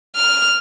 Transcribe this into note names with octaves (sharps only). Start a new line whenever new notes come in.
F6